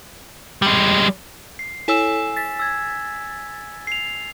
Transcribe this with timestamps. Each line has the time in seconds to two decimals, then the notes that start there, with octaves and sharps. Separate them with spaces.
0.62 G3 G#3
1.59 C7
1.88 E4 A4 C#5 G#5 E6 E7
2.36 A6 B6
2.59 E6 G#6
3.87 C7 F7